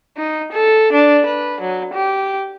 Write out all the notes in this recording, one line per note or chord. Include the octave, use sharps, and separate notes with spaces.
D#4
A4
D4
B4
F#3
G4